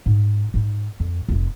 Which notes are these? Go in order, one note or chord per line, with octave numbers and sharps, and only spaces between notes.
G#2
G#2 D#4
F2
F1 C3